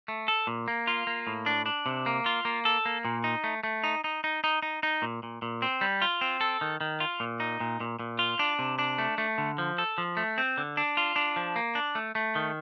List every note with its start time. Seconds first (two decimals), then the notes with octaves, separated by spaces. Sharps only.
0.08 A3
0.28 A4
0.47 A#2
0.68 A#3
0.87 F4
1.07 A#3
1.27 A2
1.46 D4
1.66 D4
1.86 C3
2.06 A#3
2.26 F4
2.45 A#3
2.65 A4
2.86 A#3
3.05 A#2
3.24 D#4
3.44 A3
3.64 A3
3.84 D#4
4.04 D#4
4.24 D#4
4.44 D#4
4.62 D#4
4.83 D#4
5.02 A#2
5.23 A#2
5.42 A#2
5.62 C4
5.81 G3
6.02 F4
6.21 C4
6.41 A4
6.61 D#3
6.81 D#3
7.00 F4
7.20 A#2
7.40 D#4
7.60 A#2
7.80 A#2
7.99 A#2
8.19 F4
8.39 D4
8.59 C3
8.79 D4
8.98 A3
9.18 A3
9.38 D3
9.58 F3
9.78 A4
9.98 F3
10.17 A3
10.38 C4
10.58 D3
10.77 D4
10.97 F4
11.16 D4
11.36 F3
11.56 A#3
11.75 D4
11.95 A3
12.15 A3
12.35 D#3